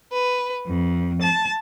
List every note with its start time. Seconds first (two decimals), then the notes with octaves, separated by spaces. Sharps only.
0.13 B4
0.66 F2
1.22 A5